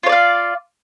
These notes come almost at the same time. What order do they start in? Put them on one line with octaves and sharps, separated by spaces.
F4 C#5 D5 F5